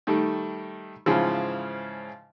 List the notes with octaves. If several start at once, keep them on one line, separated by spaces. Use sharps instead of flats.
D#3 G3 A3
G#2 C#3 E3 F3